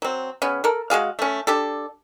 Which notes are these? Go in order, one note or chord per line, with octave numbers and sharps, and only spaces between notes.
F#3 C4
C#3 B3 C#4
A4 A#4
G#3 F#4 G#4 F5
A3 C#4
D4 G4 A4